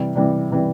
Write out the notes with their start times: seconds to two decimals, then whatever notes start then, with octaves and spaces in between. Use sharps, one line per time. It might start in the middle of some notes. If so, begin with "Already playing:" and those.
Already playing: C3 E3 G3
0.16 C3 E3 G3
0.51 C3 E3 G3